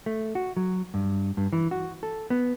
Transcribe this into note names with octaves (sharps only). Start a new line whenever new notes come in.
A3
F#4
F#3
G2
G2
E3
F#4
A4
B3